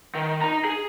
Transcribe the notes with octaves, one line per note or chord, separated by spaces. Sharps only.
D#3
D#4 A#5
G#4